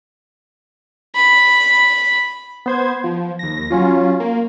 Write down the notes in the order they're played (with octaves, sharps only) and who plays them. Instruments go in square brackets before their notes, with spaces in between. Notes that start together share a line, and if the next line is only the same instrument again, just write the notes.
[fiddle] B5
[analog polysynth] B3 C5 G#6
F3
D#2 A#6
F#3 C#4 F4
A#3